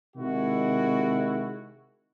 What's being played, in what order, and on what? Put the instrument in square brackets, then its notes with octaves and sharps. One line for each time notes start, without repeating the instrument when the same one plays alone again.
[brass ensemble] C3 D#3 G#3 E4 F#4